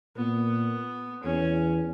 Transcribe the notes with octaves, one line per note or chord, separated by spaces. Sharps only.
A#2 B3
E2 C#4